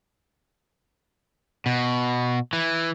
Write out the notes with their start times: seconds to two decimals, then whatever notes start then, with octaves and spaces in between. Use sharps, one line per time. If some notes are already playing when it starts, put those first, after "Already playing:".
1.66 B2
2.53 E3